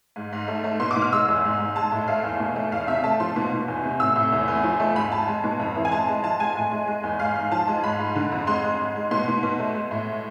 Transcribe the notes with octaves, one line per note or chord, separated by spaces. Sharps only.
G#2
G#2
A3
A3
B2 C6
D6
B2
F6
G#3 E6
E2
G#2
G#2
G#3 A5
A2
A3 F5
E2
B2
A3
E2 F5
C3 E5
A3 A5
F3 C6
B2
B2
E2
C3
A2 E6
A2
E2
E2
F3
A3
G#2 B5
G#2 A5
G#3
B2
F2
E3
G#5
G#3 A5
G#3
F3 A5
G#3 G#5
A2
G#3
G#3
E2
G#2 F5
G#2
F3 A5
G#3
G#2 B5
G#2
D3
F2
G#3 C6
G#3
G#2
G#3
B2 C6
B2
B2
A3
G#3
A2